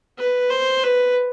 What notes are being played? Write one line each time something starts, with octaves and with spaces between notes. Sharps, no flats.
B4
C5
B4